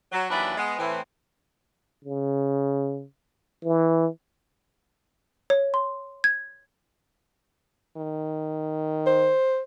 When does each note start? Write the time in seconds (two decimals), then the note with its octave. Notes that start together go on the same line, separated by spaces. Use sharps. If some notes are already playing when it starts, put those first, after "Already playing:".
0.12 F#3
0.29 D#2 E3 F#3 D4 B4 D5
0.57 G#3 B3
0.78 A2 E3 C4
2.04 C#3
3.64 E3
5.50 C#5
5.74 C6
6.24 G#6
7.97 D#3
9.07 C5